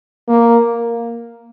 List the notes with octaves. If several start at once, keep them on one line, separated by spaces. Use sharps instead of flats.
A#3